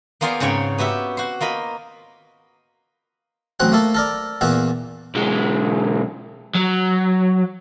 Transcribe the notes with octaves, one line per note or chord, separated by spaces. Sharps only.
A#3 B3 F4 G#4 C5 D5
G#2 C#3 C4 C#5 G5 B5
B3 F#4 G4 E5
F#4 C5
A#3 F4 D#5 B5
A1 F#3 C4 F#5
A3 A#3 E4 A4
A4 A#4 D5
E2 A#2 B3 E4
B1 G#3
F#3